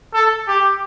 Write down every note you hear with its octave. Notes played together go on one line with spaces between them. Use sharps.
A4
G4